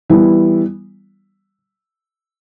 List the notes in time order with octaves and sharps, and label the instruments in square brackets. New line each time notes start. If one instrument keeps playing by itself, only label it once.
[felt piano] E3 G3 B3 E4